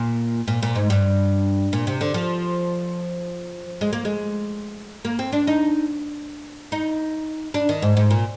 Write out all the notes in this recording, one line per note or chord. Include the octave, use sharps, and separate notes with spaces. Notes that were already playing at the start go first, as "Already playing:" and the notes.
Already playing: A#2
A#2
A#2
G#2
G2
A#2
C3
D3
F3
G#3
A#3
G#3
A#3
C4
D4
D#4
D#4
D4
D#3
G#2
G#2
A#2